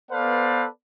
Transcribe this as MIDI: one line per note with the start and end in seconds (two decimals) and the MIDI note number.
0.12 0.66 59
0.12 0.66 69
0.12 0.66 71
0.12 0.66 72
0.12 0.66 74
0.12 0.66 77